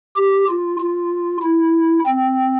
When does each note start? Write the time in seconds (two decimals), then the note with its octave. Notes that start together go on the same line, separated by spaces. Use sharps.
0.16 G4
0.48 F4
0.80 F4
1.42 E4
2.06 C4